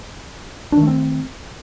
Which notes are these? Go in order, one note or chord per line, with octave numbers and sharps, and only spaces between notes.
D#3 A3 C4 D4